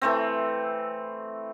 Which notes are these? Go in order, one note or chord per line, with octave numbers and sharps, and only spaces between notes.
E3 A3 C4